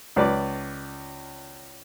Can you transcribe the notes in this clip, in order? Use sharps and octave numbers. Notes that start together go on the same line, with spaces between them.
C#2 B4 D5